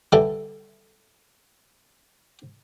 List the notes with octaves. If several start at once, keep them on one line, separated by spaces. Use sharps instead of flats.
D3 E3 G3 E4 A4